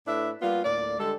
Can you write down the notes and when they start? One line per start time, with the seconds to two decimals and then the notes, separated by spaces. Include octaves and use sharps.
0.08 A2 A3 D4 E4 B4 E5
0.42 G3 A#3 B3 F4
0.65 D2 A2 A#3 D5
0.99 D3 G3 G#3 A4